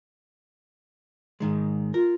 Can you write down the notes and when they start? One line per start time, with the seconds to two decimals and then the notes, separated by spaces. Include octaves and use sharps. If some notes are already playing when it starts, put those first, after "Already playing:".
1.40 G#2 D#3 G#3
1.94 F4 A#4